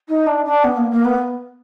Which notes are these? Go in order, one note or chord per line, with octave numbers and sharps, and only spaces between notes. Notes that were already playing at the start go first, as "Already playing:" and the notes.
D#4
D4
D4
B3
A#3
A#3
B3